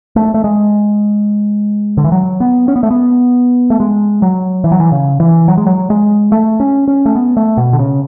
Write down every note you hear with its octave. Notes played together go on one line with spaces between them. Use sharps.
A3
A3
G#3
D3
E3
F#3
B3
C#4
B3
A3
B3
A3
G#3
F#3
E3
F#3
E3
C#3
E3
F#3
G#3
F#3
G#3
A3
C#4
C#4
A3
B3
A3
B2
D3
C#3